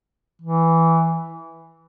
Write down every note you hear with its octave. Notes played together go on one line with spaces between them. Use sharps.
E3